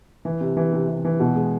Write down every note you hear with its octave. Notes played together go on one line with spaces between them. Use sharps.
E3
C3
E3
C3
C3
E3
B2
G#3